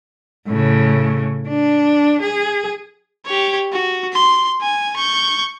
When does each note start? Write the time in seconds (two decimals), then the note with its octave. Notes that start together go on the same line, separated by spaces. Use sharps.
0.48 A2 C#3
1.49 D4
2.22 G#4
3.26 G4 C#5
3.73 F#4
4.13 C6
4.61 G#5
4.96 C#6 G6